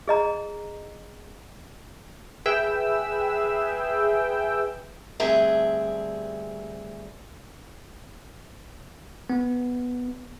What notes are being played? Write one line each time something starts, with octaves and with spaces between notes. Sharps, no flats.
G#4 D#5 A#5
G#4 B4 E5 G5 E6
D2 G2 C4 G#4 E5
B3